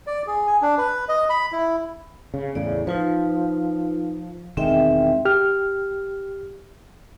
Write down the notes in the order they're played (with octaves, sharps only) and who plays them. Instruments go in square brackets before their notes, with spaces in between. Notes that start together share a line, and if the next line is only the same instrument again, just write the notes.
[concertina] D5
G#4
G#5
D4
B4
D#5
B5
E4
[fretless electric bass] C#3
[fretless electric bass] E2 A2 C#3 [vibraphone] D5
[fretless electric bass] F3 [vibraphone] D#4 F4 B4
[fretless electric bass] E1 D#3 G#3 [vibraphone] C4 E5 G5
[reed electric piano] G4 F6